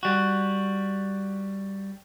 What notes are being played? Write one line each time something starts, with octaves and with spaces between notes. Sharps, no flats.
G3 F#4